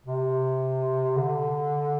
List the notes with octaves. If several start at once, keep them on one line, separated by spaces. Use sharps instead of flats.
C3
D3